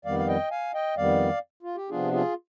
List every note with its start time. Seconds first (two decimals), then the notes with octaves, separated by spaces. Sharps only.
0.05 F2 D#3 G3 B3 D5 F5
0.19 F5
0.28 D#5 G5
0.51 F5 G#5
0.74 D#5 G5
0.97 F2 D#3 G3 B3 D5 F5
1.63 F4
1.76 G4
1.89 C3 F3 B3 D4 F4 G#4
2.12 F4 G#4